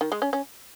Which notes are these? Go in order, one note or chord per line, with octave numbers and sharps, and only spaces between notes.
D#3
G#3
C#4
C#4